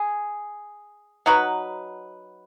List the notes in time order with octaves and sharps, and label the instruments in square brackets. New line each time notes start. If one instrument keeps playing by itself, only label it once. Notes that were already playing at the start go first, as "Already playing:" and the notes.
Already playing: [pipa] G#4
F#3 D#4 F#4 B4